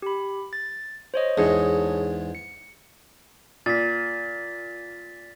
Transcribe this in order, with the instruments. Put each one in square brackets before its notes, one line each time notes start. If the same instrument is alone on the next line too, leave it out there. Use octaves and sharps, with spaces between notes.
[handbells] G4 B5
A6
C5 C#5 D#5
[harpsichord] E2 G#2 [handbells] D4 G#4 C#5
[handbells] C#7
[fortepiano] A#2 [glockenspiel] A6 B6